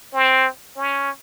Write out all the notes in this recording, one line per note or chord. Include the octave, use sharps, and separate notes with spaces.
C4
C#4